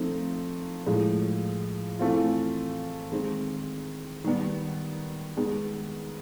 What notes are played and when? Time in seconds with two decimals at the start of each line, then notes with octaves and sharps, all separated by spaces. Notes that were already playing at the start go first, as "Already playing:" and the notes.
Already playing: F3 A3 C4 D#4
0.86 A2 F3 G#3
1.99 E3 A3 C4 F4
3.12 D#3 G#3 C4
4.24 D#3 G3 B3
5.37 D#3 G#3 B3